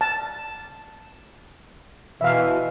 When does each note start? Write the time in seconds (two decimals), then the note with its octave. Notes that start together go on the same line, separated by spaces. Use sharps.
0.01 A5
2.21 B2 E3 E5 F5